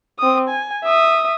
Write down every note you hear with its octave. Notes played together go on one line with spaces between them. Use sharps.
C4 D#6
G#5
E5 D#6